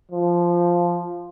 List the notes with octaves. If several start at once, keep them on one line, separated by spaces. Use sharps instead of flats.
F3